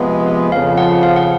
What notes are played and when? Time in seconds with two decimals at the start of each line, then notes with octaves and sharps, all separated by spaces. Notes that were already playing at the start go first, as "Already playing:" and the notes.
Already playing: C3 F3 G#3 B3
0.52 F2 C#3 F3 F5
0.77 F#5
1.03 F5
1.16 F#5